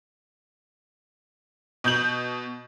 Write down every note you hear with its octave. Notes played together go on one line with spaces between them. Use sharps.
B2 G6 F#7